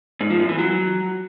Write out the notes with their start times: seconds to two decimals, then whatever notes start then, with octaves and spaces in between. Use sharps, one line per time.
0.21 G#2
0.30 F3
0.39 F#2
0.49 E3
0.58 F#3